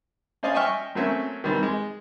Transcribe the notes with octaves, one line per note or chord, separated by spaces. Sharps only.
C#4 C5 D5 D#5 F5 G#5
D#5 E5 G5 G#5 C#6 F6
F#3 A3 A#3 C4 C#4 E5
D#3 E3 G3 C4
G#3